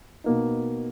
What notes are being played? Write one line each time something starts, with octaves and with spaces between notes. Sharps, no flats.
B2 A#3 D#4